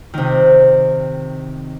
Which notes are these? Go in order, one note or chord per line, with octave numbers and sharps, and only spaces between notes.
C3 D#3